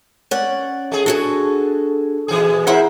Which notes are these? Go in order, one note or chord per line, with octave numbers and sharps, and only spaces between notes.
C#4 D5 F#5
A3 G#4
D4 F#4 G#4 A4
A#2 E3 G#4
E4 A#4 C5 E5 F#5